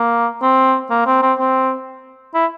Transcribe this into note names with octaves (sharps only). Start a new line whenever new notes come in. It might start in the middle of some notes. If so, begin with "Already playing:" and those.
Already playing: A#3
C4
A#3
C4
C4
C4
E4